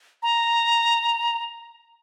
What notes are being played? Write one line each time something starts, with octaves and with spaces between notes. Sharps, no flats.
A#5